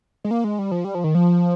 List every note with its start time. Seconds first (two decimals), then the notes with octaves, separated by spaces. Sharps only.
0.24 G#3
0.31 A#3
0.44 G#3
0.59 G3
0.71 F3
0.84 G3
0.95 F3
1.04 D#3
1.15 F3